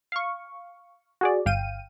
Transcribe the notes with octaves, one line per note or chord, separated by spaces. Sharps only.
F5 C#6
F#4 G#4 D5
G1 F5 G5 D#7